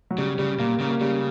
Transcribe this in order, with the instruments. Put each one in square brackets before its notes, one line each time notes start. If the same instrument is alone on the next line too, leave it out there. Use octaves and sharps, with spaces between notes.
[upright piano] F#3
[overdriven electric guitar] C#3 [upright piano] G3
[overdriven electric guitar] C#3 [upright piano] G3
[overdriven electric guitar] A#2 [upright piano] A#3
[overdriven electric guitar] C#3 [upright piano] A#3
[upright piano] A#3
[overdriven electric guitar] C#3 [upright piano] G3